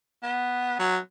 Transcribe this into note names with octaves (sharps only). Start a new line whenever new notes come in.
B3
F#3